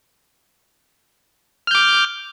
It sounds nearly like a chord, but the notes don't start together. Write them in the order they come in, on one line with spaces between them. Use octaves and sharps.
F6 G6 D6